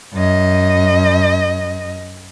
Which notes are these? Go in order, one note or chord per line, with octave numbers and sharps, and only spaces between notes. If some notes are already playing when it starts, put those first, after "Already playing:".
F#2 D#5